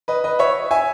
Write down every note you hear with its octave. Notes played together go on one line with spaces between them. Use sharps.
B4 D#5
B4 D#5
C#5 E5
E5 G#5